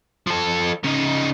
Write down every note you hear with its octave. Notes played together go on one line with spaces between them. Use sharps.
F3 A4
C#3 D#4